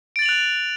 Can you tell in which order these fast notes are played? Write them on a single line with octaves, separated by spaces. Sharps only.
D7 A6 F#7 F7 F#6